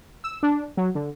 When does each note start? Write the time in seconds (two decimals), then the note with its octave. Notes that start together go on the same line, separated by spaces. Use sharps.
0.24 E6
0.43 D4
0.77 F#3
0.95 D3